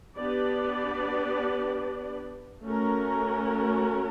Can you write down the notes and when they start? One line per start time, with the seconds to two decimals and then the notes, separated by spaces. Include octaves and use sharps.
0.17 B3 D4 G4 B4 D5
2.64 A3 C#4 F#4 A#4